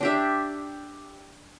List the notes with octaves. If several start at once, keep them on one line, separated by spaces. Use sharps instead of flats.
D4 G4 E5